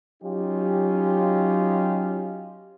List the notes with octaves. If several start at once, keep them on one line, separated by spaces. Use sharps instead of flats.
F#3 C#4 D#4 F4 G4